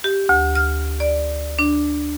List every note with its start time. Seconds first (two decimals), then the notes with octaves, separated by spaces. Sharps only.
0.04 G4
0.29 D2
0.55 F6
1.00 D5
1.59 D4